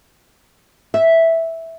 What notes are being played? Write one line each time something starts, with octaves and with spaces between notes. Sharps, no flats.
E5